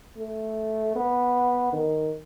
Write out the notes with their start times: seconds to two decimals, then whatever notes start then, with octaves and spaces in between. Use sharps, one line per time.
0.17 A3
0.95 B3
1.72 D#3